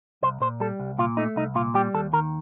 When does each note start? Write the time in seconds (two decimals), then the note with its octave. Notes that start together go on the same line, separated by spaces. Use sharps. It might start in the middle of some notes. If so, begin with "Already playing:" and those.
0.22 C2 C5
0.40 A#2 C5
0.60 G3 A4
0.80 C2
0.98 A#2 F4
1.17 A3 D#4
1.36 C2 D#4
1.55 A#2 F4
1.74 G3 G4
1.94 D#2 A4
2.13 D#3 A#4